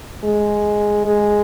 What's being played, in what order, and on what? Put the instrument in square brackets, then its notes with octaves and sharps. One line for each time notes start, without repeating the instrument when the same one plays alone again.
[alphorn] G#3
G#3